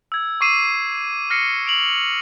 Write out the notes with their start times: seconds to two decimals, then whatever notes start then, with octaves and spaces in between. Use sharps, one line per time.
0.12 E6 G#6
0.41 C#6 D6 C7 D#7 E7
1.30 F6 A#6 C7 C#7
1.66 D7 F7 F#7